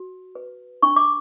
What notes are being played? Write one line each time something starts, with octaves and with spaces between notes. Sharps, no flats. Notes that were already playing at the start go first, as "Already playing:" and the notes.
Already playing: F#4
B4
D4 C#6
D6